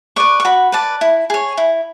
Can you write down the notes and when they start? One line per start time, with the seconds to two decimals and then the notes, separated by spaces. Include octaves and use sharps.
0.16 B4 D5 C#6
0.40 C#6
0.45 F#4 B5
0.72 B4 D5 A5
1.01 E4
1.30 G#4 C#5
1.57 E4